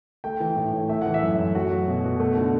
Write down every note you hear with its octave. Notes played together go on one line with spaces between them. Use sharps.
A3 G5
E3
A2
A2
A3 E5
E3 F#5
E5
F#2
F#2
A3 F#4
F#3
B2
B2
A3
D3